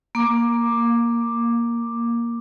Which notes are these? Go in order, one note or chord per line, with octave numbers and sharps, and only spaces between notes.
A#3 D6